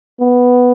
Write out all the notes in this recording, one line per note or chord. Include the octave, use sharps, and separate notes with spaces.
B3